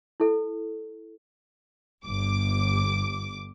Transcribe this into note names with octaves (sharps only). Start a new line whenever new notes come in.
E4 A4
G1 D6